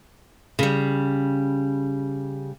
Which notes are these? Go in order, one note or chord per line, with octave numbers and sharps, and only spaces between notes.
C#3 G3